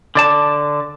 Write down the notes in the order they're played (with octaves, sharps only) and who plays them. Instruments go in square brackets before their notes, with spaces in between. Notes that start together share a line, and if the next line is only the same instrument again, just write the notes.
[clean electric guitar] D3 D5 A5